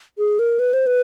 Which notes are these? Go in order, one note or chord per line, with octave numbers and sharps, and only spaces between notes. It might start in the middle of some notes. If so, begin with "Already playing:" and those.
G#4
A#4
B4
C5
B4